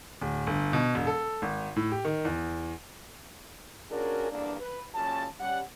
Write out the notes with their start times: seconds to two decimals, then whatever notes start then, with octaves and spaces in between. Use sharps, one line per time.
0.21 D1
0.47 G1
0.73 B2
0.95 E1
1.07 A4
1.42 G#1
1.76 A2
1.92 G4
2.05 D#3
2.25 E2
3.91 A#2 C#4 D4 F#4 G#4 A#4
4.31 E2 G2 D3 A#3 D4
4.60 B4
4.94 F#2 A#2 C#3 C#4 A5
5.40 G3 C#4 F#5